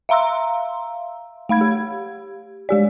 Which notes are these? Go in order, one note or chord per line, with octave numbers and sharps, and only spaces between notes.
E5 F5 A#5 C6 E6
A3 F5 B5 G#6
G4
G#3 G4 D5